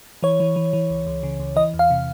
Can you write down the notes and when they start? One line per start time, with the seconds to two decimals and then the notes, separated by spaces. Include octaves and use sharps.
0.23 E3 C#5
0.40 E3
0.56 E3
0.73 E3
0.90 C#2
1.07 C#2
1.23 C#3
1.40 C#2
1.56 E3 D#5
1.74 E2
1.79 F5
1.90 C3